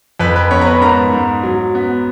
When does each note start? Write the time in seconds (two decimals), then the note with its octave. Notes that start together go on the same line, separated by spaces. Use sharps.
0.20 F2 B4 B5
0.36 B4 B5
0.51 B3 C#5 C#6
0.61 A#5
0.66 B4 B5
0.81 G#2 A#4 A#5
1.12 G#2
1.43 F#3
1.75 B3